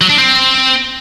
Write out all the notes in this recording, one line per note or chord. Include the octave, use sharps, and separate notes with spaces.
F#3
D4
C4